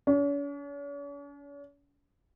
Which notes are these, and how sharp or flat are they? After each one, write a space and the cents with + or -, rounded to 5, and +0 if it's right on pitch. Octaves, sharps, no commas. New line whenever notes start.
C#4 +45